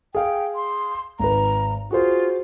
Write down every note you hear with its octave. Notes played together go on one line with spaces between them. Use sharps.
G#4 F5 G5
C6
G#1 B4 A#5
F4 F#4 G#4 C5